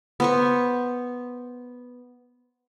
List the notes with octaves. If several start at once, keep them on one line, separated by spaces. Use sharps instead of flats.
B3 C5 C#6